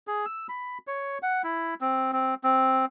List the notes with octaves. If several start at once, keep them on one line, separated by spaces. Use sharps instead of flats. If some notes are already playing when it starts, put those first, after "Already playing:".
G#4
E6
B5
C#5
F#5
E4
C4
C4
C4